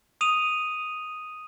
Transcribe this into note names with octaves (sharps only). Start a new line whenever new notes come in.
D#6 D#7 F7